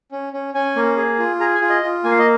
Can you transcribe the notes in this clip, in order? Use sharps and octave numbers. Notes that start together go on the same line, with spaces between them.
C#4
C#4
C#4 G#5
A#3
G#4
F4
G#4 A#5
G#5
F4
D#5
F4
A#3 G#5
F5
D#5